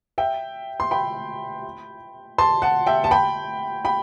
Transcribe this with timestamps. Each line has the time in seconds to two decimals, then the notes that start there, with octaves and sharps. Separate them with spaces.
0.18 E5 G5
0.80 C6
0.91 G5 B5
2.38 A5 C6
2.62 F#5 A5
2.86 E5 G5
3.04 A5
3.11 G5 B5
3.85 G5 B5